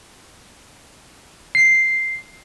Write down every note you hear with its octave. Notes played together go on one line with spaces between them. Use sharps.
C7